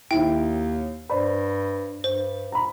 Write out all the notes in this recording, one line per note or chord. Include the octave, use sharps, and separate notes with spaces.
D#2 D#3 E4 G5
G2 C5 D5 B5
G2 C5
A#5 B5